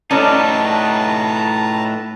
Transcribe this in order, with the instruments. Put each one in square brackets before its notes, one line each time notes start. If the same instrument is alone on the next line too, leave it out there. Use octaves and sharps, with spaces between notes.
[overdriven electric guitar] A2 D#4 [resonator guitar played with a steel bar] C#4 A4 D5 [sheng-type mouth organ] B4 A5 A#5